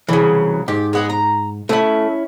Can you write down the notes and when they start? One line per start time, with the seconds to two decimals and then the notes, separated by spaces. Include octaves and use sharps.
0.08 C2 C#3 E3 F#3
0.68 G#2 G4
0.93 G#3 B3 G#4
1.10 A#5
1.69 A3 C#4 E4